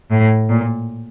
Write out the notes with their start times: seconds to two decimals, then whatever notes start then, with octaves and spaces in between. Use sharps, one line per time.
0.11 A2
0.50 A#2